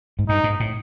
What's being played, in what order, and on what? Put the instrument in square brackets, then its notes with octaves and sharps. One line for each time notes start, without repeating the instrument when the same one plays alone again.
[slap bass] G#2
[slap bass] G2 [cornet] D#4
[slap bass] G#2
A2